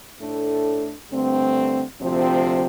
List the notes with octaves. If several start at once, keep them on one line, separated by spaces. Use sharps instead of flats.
A2 A3 D4 A4
G2 D3 A3 C4
D2 C3 F3 C4